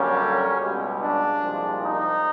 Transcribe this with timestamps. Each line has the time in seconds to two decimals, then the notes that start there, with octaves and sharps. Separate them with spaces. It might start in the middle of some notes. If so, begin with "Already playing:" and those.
Already playing: F#2 D3 G3 A#3 C#4
0.60 C#2 B2 G3
1.00 D4
1.41 C2 A#2 F3 G#3
1.82 D#4